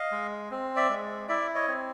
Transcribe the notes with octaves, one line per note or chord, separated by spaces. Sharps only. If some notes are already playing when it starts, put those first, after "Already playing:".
Already playing: D#5 F5
G#3
C4
D5 E5
G#3
E4 D5 E5
C#5 D#5
C4